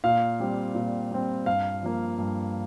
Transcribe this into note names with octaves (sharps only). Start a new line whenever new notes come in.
A#2 F5
G3 C4
A#2
G3 C4
G2 F5
F3 A#3
G2